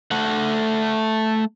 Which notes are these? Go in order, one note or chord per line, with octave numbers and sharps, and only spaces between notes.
A3 F#5